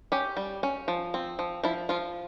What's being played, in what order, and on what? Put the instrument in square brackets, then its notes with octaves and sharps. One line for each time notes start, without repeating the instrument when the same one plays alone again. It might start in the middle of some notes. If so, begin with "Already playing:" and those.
[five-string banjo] C#4 G4
G3
C#4
F3
C4
F3
F3 E4
F3 F4